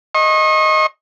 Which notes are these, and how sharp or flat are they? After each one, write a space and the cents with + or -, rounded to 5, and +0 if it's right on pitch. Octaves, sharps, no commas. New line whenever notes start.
D#5 +0 C#6 -40